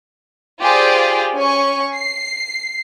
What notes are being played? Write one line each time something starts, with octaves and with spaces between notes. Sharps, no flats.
F4 G4 G#4 C5 D5
C#4 G#5 C#6
C7